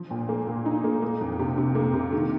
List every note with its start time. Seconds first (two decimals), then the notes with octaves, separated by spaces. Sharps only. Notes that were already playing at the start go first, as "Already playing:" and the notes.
Already playing: F3
0.11 A#2
0.29 A#3
0.47 A#2
0.66 D#4
0.84 A#3
1.02 A#3
1.21 F2
1.39 C3
1.58 C3
1.75 A#3
1.94 C3
2.12 D#3